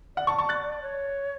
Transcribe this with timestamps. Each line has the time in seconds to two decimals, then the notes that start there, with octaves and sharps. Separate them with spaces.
0.16 D5 F#5
0.27 A5 C#6
0.39 A5 C#6
0.49 F#6 A6
0.82 C#5